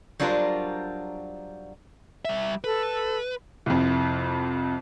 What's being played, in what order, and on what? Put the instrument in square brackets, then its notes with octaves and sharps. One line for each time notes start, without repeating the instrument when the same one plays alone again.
[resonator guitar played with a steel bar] F#3 G3 D4 F4 A#4 C5
[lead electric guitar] G3 E5
[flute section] A4 [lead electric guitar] B4
[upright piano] C2 F2